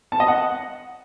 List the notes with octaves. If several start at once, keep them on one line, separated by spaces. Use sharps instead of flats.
A5
D#5
F#5